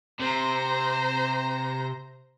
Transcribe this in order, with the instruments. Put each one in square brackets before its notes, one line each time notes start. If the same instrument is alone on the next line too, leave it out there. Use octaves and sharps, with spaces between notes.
[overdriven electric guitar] C3 [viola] C5 A#5